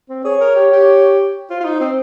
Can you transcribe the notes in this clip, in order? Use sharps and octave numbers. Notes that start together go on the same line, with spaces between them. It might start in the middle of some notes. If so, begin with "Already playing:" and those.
C4
G#4 C#5
A#4
G4
G4
F4 C5
F4
D#4
C4